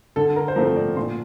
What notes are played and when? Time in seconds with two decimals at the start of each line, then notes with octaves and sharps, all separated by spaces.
0.16 D3 A4
0.36 A#4
0.48 C5
0.56 F3 A3 C4 A#4
0.76 D5
0.96 A#2 C6